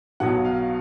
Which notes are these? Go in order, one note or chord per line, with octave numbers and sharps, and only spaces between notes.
B1 B2 F#3 F#5
F5